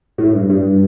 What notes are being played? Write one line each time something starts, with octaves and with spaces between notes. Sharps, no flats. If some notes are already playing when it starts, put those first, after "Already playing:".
A2
G2
G2